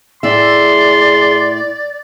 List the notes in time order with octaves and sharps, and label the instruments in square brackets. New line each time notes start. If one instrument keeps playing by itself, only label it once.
[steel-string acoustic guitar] A2 E5 [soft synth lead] G#4 [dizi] D5 [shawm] C6